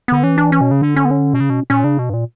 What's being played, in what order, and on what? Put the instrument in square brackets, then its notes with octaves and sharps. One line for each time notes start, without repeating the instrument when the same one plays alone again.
[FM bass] D3 [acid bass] B3
[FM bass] E3 [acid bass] C#4
[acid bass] D4
C#4
[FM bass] B2
C#3
[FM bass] D3 [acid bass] D4
[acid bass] C#4
B3
C#4
[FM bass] B2
C#3
B2
[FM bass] A#2 [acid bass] C#4
[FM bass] C#3 [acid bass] D4
[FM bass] B2
G2
A#2